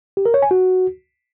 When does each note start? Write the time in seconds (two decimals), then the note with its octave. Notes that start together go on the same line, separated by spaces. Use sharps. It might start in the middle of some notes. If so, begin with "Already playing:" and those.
0.17 G4
0.26 A#4
0.34 C#5
0.42 G#5
0.51 F#4